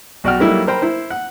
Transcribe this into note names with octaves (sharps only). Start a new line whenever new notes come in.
B1 F#4 D5 F#5 G5 F6
F#3 G3 A3 A#3 D#4 E4
A#4 C5 G5 B5
E4 C5
F#5